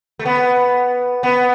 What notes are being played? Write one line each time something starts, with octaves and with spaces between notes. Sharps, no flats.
A3
B3
B3